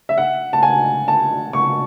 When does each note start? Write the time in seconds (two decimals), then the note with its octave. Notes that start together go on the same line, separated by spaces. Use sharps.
0.09 E5
0.18 F#5
0.53 A5
0.63 G#5
1.08 A5
1.53 C#6